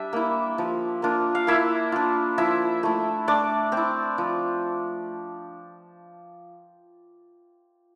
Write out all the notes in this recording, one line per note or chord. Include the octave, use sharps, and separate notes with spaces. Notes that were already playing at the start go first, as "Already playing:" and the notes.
Already playing: G3 D4 E5
A#3 E4
F3
A#3 D4 F4
F5
A#3 E4 E5
D4 F4
F3 E4 E5
A3 E4
A3 D4 D5
C4
E4
F3